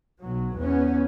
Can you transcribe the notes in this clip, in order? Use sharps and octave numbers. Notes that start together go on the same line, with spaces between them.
B1 F#3
E2 B3 C#4